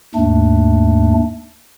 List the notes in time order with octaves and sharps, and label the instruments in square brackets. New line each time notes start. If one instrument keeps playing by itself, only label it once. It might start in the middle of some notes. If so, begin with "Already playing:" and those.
[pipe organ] D#2 G#2 A3 D4